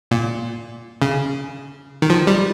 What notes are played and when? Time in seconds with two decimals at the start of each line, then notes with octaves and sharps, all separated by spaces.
0.11 A#2
1.02 C#3
2.02 D#3
2.10 F3
2.27 G3